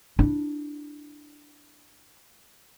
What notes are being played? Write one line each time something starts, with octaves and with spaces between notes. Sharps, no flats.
D4 E4